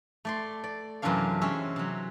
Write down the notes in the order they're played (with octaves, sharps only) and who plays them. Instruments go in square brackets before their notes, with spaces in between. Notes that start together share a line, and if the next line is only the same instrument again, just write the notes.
[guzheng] A3 D5 C6
D5
F#2 C3 E3 C#4 D4 F5
G#3 C4 C#4 E5
C3 F#3